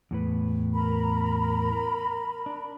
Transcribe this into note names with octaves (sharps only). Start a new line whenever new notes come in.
E2 A2 B4
A#4 A#5 B5
D4